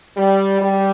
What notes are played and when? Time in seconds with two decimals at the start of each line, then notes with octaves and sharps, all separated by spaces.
0.16 G3
0.60 G3